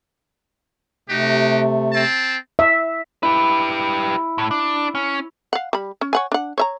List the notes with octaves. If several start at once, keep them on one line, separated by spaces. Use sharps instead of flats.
C3 A3 D#4 F#4 G4
C4 A5
E5
E4 G4 B4
A2
D4
C#4
F5 F#5
G3 B5
C#4
C#5 F#5 G#5
D4 F#5
C#5 E5 A#5